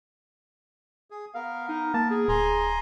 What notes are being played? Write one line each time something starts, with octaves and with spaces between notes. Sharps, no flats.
G#4
B3 A#4 F5
D#4
A#3 A5
G#4
D1 G#5 A#5 C6